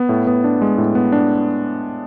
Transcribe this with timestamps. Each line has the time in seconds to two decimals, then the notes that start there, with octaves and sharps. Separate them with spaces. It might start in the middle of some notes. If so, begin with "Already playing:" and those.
Already playing: B3
0.09 A2
0.27 B3
0.44 D4
0.62 G#3
0.78 A2
0.95 B3
1.12 D4